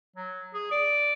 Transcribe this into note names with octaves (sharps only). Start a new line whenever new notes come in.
F#3
G#4
D5